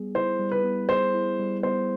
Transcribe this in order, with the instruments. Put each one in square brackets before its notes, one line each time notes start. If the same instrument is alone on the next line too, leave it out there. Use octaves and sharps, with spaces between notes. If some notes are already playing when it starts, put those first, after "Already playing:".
Already playing: [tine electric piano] G3 B3 G#4
[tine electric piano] E4 [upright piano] C5
[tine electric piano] G3
[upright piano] B4
[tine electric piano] B3
[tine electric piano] G#4 [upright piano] C5
[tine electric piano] E4
G3
[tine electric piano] B3 [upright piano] C5